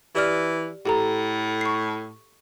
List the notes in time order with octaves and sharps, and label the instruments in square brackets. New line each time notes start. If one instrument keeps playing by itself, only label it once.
[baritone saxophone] E3 [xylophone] G4 D5 F6
[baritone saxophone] A2 [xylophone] G4 A4 A#5
[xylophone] C#6 C7